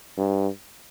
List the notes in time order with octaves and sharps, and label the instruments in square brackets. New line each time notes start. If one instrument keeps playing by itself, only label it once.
[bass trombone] G2